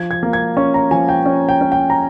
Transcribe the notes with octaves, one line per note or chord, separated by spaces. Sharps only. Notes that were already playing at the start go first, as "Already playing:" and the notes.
Already playing: F3 G#6
G#6
A#3
G#6
C#4 C#6
A#5
F3 G#5
G5
C#4
G5
C#4
G5
A#5